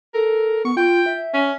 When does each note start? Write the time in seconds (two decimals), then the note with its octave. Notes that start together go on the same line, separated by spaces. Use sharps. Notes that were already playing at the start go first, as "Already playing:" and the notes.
0.14 A4 A#4
0.65 B3 C#6
0.76 F4 G5
1.06 E5
1.33 C#4